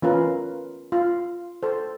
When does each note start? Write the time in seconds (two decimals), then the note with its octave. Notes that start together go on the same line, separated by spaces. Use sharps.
0.02 E3 B3 C#4 F4 A#4 B4
0.92 F4
1.63 A4 C5